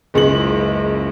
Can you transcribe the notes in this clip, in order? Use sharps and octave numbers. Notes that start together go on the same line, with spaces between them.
F#1 C#2 G#3 F#7